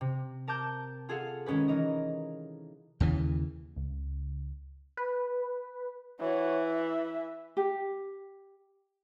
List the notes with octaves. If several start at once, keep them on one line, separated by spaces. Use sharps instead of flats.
C3
A#4 A5 D6 G6
F4 G#4 A4 F5 F#5
D#3 G#3 C#4 G#4 B4
E3 D#4 A#4 D#5
D#2 C#3 E3
C#2
B4
E3 F#4 C#5
E5
G4